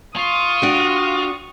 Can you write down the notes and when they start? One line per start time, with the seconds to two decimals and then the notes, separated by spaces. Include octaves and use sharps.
0.16 F4 C#6 D#6
0.62 D4 F#4 G4